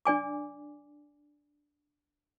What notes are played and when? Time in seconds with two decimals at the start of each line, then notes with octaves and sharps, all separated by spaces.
0.05 D4 D5 G#5 D6